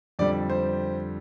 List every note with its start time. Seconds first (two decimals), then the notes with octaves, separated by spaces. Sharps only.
0.19 F2 D3 G3 D5
0.50 C5